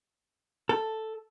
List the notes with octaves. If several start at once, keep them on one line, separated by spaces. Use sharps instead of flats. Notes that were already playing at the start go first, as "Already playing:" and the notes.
A4